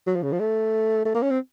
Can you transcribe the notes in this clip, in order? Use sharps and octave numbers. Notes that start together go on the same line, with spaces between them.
F#3
F3
C#3
F3
A3
A3
A#3
C#4
C4